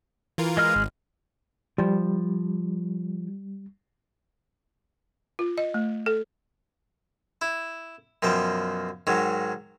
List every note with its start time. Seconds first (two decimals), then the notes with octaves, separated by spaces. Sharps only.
0.38 E3 F4 A#4
0.57 G#3 D#5 F6
0.76 G#1
1.78 F3 G3
5.39 F4
5.58 D#5
5.74 A3
6.06 A4
7.41 E4
8.23 F#2 B2 F3 G5
9.07 G#2 D#3 F#3